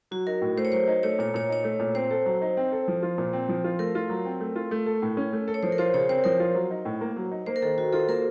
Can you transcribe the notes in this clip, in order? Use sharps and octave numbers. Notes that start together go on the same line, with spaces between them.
F#3 F#4
D#4 A#4
A2
A3 C5
C#5
F#3 C5
D#4
A3 C#5
A#2 C#5
A#2 C#5
D#4 C#5
A3
A#2
C4 C5
A4
F#3
D#4
C4
A4
F3
F4
A#2
C4
F3
F4
A3 A#4
F4
F#3
C4
A3
F4
A3
A4
A2
C#4
A3
A4
C#5
F3 C5
A#4
F4 C5
C#3 C#5
C4 C5
F3 A#4
F4
F#3
D#4
A2
A#3
F#3
D#4
A#3 C5
A#4
D#3 A4
D#3 F#4
F4 A4
A#3 A#4